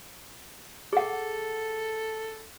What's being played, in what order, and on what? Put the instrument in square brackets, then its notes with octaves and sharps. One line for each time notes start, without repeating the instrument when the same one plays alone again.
[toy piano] G#4 F#5 [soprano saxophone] A4